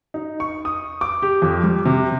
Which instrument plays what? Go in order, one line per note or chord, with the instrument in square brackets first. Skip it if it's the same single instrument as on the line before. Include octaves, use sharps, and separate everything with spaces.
[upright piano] D#4
C#6
D#6
D6
G4
F2
G3
C3